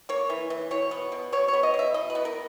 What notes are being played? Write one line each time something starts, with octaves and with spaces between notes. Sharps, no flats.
A#3 C#5
E3
E3
B2 C#5
B3
B2
B2 C#5
C#5
B3
D#5
B2
E5
E3 D#5
B4
B3
A#4